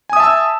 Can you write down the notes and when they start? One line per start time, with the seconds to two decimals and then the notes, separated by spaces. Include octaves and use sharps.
0.10 G#5
0.13 D#6
0.16 E5
0.20 A5
0.23 E6